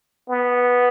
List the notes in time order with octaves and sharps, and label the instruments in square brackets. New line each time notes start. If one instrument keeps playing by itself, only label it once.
[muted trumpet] B3